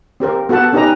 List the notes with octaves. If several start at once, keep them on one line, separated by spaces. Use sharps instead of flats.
C4 G4 A#4 C5
B3 F#4 A4 F#5 A5
C#4 D#4 G4 B4 D#5 A#5